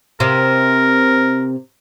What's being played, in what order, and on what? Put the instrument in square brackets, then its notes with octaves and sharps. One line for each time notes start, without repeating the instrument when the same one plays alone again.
[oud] C3 C4 [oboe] A#4